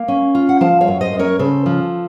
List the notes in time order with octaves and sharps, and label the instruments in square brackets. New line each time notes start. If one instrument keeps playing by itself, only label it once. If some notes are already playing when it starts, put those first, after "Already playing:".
Already playing: [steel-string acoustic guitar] A#3 F5
C#4
F4
F#5
F3 F5 A5
C#5 F5
F#2
C5 D#5
F#2
A#4 C#5
C#3 A4 C5
F3